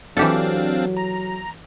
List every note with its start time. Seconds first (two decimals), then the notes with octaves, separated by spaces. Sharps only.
0.17 E3 F#3 C4 D4 G4 A4 F5
0.97 A#5